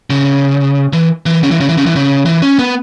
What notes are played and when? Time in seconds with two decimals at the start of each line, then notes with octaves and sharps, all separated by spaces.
0.10 C#3
0.93 E3
1.26 E3
1.43 C#3
1.51 E3
1.60 C#3
1.69 E3
1.77 C#3
1.86 E3
1.96 C#3
2.25 E3
2.42 C#4
2.59 B3